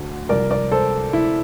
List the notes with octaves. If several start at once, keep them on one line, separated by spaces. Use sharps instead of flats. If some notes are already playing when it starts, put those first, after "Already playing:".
Already playing: D2 D3
C2 C3 F3 A#4 D5
A#4 D5
A4 C5
E4